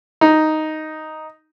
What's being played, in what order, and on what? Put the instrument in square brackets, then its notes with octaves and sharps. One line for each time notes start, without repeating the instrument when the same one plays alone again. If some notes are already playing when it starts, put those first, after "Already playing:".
[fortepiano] D#4